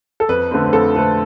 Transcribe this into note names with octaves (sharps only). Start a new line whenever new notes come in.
A4
F2 B4
D3 A3 C4 B4
B4
F2 A4
D3 A3 C4 B4